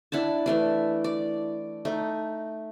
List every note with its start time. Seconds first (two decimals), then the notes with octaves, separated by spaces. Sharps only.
0.12 D4 E4 F#5 A5
0.46 E3 A3 D4
1.04 D5
1.85 A3 D#4